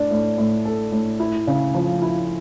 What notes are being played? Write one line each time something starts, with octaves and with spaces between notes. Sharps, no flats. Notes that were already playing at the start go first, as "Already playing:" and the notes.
Already playing: A2 D4
A2
A2
A4
A2
E4
C#3
F3
E4